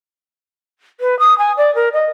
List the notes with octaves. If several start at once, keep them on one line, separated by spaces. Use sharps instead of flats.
B4
D#6
G#5
D5
A#4
D#5